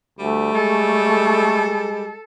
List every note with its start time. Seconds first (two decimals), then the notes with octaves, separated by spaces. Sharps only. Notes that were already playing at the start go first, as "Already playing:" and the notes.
0.19 D2 G3 A3
0.54 G#3 A4